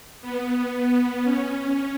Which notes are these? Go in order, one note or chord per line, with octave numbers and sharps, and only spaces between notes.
B3
C#4